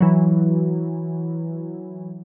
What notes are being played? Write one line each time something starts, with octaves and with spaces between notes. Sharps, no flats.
E3 F#3